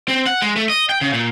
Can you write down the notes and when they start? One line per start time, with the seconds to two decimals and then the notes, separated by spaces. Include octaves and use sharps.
0.08 C4
0.26 F#5
0.42 G#3
0.56 A3
0.69 D#5
0.89 G5
1.01 C#3
1.13 A#2